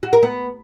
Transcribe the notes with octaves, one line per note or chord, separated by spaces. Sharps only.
F#4
A#4
B3